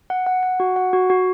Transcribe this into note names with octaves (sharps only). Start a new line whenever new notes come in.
F#5
F#5
F#5
F#4
F#5
F#4
F#4